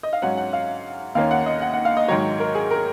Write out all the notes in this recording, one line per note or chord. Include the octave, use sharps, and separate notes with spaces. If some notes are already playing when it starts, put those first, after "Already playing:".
D#5
F5
G#2 F#3 C#4 F#5
F#5
F5
D#2 D#3 A#3 C#4 F5
F#5
D#5
F#5
F#5
F5
D#5
G#2 D#3 F#3 C#5
A#4
G#4
A#4